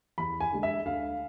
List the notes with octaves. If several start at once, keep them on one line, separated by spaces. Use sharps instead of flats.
E2 B5
G#5
D3 G#3
E5
D2 F5